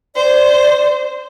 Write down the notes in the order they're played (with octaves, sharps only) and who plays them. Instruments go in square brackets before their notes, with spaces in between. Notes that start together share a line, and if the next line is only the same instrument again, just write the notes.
[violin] C5 [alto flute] D5